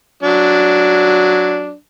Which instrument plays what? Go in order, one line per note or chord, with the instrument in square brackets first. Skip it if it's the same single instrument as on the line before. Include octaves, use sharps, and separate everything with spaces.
[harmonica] F#3 D4